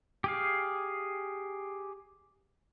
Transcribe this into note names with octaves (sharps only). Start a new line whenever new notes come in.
G4 G#4 F5